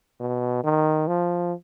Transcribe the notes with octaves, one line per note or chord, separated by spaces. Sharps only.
B2
D#3
F3